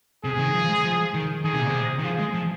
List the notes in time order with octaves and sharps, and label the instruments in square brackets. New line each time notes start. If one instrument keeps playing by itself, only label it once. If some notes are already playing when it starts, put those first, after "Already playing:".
[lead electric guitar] C3 [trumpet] G#4
[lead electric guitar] D#3
F3
G#3
F3
D#3
[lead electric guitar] D#3 [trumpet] G#4
[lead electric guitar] C3
A#2
C3
D#3
[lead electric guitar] F3 [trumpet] G#4
[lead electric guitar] G#3
F3